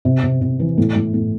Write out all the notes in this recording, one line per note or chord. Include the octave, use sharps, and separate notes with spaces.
C3
C3
C3
E3
A2
A2
A2